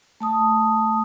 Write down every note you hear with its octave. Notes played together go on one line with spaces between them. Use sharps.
A3 A5 D#6